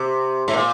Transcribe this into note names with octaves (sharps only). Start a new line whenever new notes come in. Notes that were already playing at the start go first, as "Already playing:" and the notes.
Already playing: C3
G#2
A#2